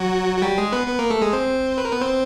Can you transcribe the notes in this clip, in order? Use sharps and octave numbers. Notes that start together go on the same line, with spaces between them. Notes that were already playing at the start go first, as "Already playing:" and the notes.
Already playing: F#3 F#4
F#4
G3 G4
G#3 G#4
B3 B4
B3 B4
A#3 A#4
A3 A4
G#3 G#4
C4 C5
B4
A#4
B3 B4
C4 C5